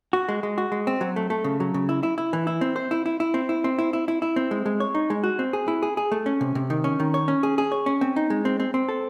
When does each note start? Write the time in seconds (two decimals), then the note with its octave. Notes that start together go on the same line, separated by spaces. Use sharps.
0.13 F#4
0.29 G#3
0.43 G#3
0.58 F#4
0.72 G#3
0.87 C4
1.01 F#3
1.16 A3
1.30 A3
1.44 C#3
1.60 F#3
1.74 C#3
1.89 E4
2.03 E4
2.18 E4
2.33 E3
2.47 E4
2.61 C4
2.76 C5
2.91 E4
3.06 E4
3.20 E4
3.34 C4
3.49 E4
3.64 C4
3.78 E4
3.93 E4
4.08 E4
4.22 E4
4.36 C4
4.51 G#3
4.66 G#3
4.80 C#5
4.95 D#4
5.10 G#3
5.24 F#4
5.39 C4
5.53 G#4
5.68 E4
5.82 G#4
5.97 G#4
6.12 A3
6.26 C#4
6.41 C3
6.55 C3
6.70 D#3
6.84 C#4
7.00 D#3
7.14 C#5
7.28 C#4
7.43 G#4
7.58 G#4
7.72 C#5
7.86 C#4
8.01 C4
8.16 D#4
8.30 G#3
8.45 C4
8.60 C4
8.74 C4
8.89 A4